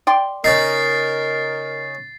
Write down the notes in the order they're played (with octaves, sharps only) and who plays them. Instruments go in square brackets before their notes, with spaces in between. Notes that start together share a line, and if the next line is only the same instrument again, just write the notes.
[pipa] D5 G5 C6
[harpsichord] C#3 D#4 [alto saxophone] A#4 [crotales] A6 C7